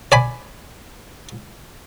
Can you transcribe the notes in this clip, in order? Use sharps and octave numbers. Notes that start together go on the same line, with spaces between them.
D5 G#5 B5